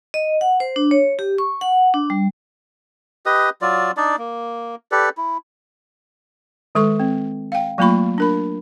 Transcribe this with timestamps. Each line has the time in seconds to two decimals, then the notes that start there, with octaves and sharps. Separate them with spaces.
0.14 D#5
0.41 F#5
0.60 C5
0.76 D4
0.91 C#5
1.19 G4
1.38 C#6
1.61 F#5
1.94 D4
2.10 G3
3.26 G4 B4 D#5 D#6
3.62 F#3 F4 D5
3.97 D4 D#4 D5
4.18 A#3
4.91 G4 A4 B4 D5
5.17 E4
6.75 D#3 G#3 A4 C#6
7.00 C4
7.52 F5 G5
7.78 F#3 A3 A#3 F4 B5 C#6
8.18 D4 A#4 B5